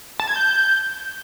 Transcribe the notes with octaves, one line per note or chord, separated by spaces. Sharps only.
A5
G#6
G6